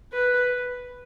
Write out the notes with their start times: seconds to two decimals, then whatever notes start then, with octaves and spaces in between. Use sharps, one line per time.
0.12 B4